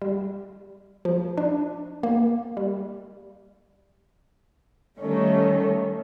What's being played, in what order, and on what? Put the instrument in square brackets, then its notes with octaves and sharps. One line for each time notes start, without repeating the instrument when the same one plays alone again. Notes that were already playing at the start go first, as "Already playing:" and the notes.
[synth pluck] G3
F3
D4
A#3
G3
[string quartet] D#3 G3 A3 C#4 C#5